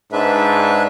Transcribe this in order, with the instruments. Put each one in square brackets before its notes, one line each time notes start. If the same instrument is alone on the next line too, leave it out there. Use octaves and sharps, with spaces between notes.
[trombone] G#2 [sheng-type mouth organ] D4 B4 E5